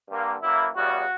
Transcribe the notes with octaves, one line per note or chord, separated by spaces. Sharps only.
G2 D3 A#3
F#2 E3 A#3 E4
E2 C#3 G3 F#4